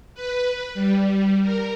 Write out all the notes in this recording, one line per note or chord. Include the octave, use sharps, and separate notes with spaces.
B4
G3
A#4